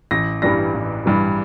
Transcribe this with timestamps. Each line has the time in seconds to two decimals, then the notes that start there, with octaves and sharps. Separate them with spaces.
0.11 A1 A#6
0.42 G2 E3 G3 D4 A#6
0.74 A1
1.06 G2 E3 G3 D4